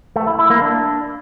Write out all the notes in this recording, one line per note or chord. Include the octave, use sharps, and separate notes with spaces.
A3
E4
E4
A#3
D4